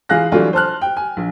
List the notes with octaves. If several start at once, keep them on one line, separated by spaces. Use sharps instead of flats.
E3 F4 G#4 F5 F#6 A#6
E3 F#3 G3 A3 D4 F4
C5 A5 F6 F#6
G5
G#5
A#1